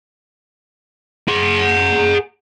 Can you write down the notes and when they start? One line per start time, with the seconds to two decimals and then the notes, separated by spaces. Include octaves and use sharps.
1.28 G#4 F#5